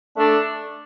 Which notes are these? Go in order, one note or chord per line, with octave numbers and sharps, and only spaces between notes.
A3 D4